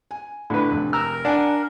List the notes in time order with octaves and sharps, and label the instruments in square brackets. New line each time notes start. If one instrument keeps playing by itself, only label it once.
[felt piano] G#5
[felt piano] A2 [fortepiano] D3 B4
[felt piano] F1
[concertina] A#4 [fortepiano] A#5 E6 F6
[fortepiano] D4 [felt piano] F#5 G#5